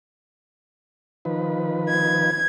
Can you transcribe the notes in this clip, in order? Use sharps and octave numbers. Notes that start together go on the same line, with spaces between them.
D#3 F3 B4
G#6